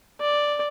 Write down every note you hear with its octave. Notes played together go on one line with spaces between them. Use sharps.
D5